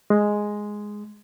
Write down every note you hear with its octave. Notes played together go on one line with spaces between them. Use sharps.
G#3